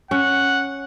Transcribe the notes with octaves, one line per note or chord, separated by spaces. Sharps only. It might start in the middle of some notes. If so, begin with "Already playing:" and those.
C#4 F#5